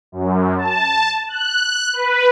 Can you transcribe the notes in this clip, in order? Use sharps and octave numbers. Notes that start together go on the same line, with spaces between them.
F#2
A5
F#6
B4